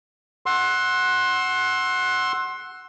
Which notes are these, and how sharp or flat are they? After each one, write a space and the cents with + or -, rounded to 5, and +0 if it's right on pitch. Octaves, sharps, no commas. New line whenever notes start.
F#5 +0 C6 +25 E6 +0